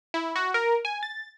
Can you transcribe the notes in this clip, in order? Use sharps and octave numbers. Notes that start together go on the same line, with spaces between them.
E4
F#4
A#4
G#5
A6